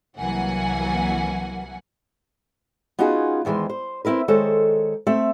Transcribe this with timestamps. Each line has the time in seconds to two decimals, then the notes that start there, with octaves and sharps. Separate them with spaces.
0.17 C2 E3 F#3 A#3 F#5 G#5
2.99 B3 C#4 D#4 F4 F#4 G#4
3.45 E2 D#3 E3 G#3 C5
3.70 C5
4.05 C4 E4 A#4 B4
4.28 D#3 G#3 A4 C5 C#5
5.07 A3 C4 E5